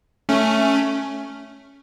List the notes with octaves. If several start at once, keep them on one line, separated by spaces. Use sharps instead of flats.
A3 C#4